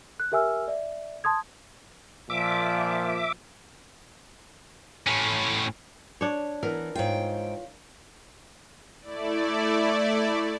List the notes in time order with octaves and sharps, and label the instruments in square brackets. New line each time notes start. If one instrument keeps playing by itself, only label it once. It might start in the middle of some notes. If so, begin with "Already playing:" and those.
[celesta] F#6
G4 A#4 E5 G#5 E6 F6
D5 E5
A5 C6 D#6 G#6
[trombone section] A#2 F3 [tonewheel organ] E5 D6
[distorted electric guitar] A2 C#4
[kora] D4 C#5
[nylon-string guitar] E3 B3 [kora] A#4
[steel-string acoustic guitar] G#2 G5 [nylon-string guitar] F4 C#5
[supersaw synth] A3 E4 D5